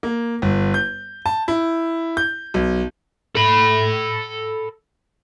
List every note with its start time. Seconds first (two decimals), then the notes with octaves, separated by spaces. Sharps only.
0.03 A#3
0.42 G1
0.74 G6
1.26 A5
1.48 E4
2.17 G6
2.54 B1
3.35 A4 B5